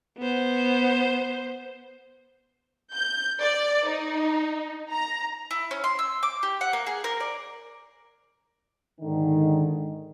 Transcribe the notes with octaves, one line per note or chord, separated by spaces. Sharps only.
B3 C5
G6
D5
D#4
A#5
E4
C#4
C6
E6
D6
G4
F#5
A#3
G#4
A#4
D5
G#2 D3 D#3